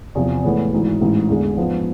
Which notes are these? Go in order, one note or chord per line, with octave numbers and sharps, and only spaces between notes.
E2 C3 F3
A2 E3 G#3 B3
G#1 G#2 E3
A1 G#2 E3
E2 D3 G#3
G#2 F3 B3